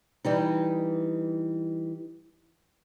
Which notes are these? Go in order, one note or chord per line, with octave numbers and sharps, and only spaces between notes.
E3 G3 D#4